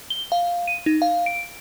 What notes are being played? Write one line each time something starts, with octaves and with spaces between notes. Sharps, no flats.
G7
F5
D#7
D#4
F5
D7